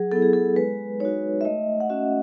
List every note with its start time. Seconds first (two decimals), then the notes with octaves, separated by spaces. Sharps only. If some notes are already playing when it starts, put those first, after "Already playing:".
Already playing: F#3 G#4
0.12 B3 E4 A4
0.22 G#4
0.33 A4
0.56 G#3 B4
1.00 D#4 F#4 C#5
1.41 E5
1.45 A3 D#5
1.80 F#5
1.90 C#4 F#4 E5